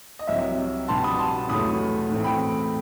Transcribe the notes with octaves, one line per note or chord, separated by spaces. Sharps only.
D#5
C2 C3 F#3 E5
B2 G3 B3 A5 C6
B5 D#6
A5 C6
E2 B2 F#3 A3 B5 D#6
A2 E3 A3 C4
G5 B5